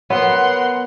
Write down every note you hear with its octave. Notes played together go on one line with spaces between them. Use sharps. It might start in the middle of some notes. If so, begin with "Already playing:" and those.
B3 A#4 C#5 F#5 C6